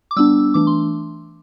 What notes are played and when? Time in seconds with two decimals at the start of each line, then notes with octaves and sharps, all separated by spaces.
0.11 D6
0.16 G3 B3 D4 E6
0.54 E3 A3 D4 D6
0.67 C6